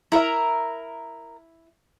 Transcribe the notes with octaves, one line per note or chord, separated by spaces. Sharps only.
E4 A#4 E5 A#5